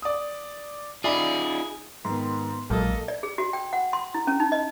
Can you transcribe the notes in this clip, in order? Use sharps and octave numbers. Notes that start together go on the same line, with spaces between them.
D5 D#6
D#4 F4 G#4 D5 E5 B5
G#2 D#3 B3 C6
A#1 A#2 F#3 G#3 A#3 A4 D#5
D5
G#4
F#4
G5
F#5
C6
E4
C#4
D#4
D#5